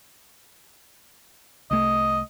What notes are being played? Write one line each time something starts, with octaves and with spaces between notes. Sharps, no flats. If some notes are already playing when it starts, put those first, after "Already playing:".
C2 A3 D#5